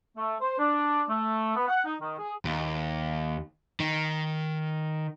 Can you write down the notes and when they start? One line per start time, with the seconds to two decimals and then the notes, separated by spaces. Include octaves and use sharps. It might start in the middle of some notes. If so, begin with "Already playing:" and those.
0.17 A3
0.41 C5
0.59 D4
1.09 A3
1.56 B3
1.68 F#5
1.85 D#4
2.01 D#3
2.19 G#4
2.45 D#2
3.80 D#3